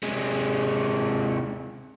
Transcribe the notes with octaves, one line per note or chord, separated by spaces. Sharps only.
C3 G#3